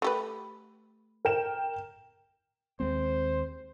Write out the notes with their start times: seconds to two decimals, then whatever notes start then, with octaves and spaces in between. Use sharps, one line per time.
0.02 A3 G4 B4
1.25 A#4 G5 E7
2.80 D#2 G#3 C4 C5